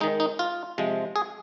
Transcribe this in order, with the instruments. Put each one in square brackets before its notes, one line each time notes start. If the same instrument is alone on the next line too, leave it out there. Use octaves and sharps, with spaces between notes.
[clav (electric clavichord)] D#3 G#3 D#4
D#4
F4
C3 F3 G#3
G#4